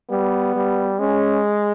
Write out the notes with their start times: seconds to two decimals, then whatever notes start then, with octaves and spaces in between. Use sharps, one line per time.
0.10 G3 B3
0.56 G3
0.99 G#3 C#4